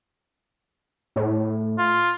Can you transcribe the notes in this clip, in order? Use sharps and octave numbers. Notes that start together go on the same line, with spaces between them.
A2
F4